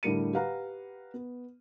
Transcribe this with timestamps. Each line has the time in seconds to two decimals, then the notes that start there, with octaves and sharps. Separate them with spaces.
0.03 A2 D3 G3 A#4 C#7 D#7
0.34 G4 B4 F5 F#5 A#5
1.14 B3